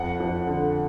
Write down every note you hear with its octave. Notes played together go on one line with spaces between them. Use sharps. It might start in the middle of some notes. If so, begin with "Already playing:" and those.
Already playing: F2 F#5
F2
D3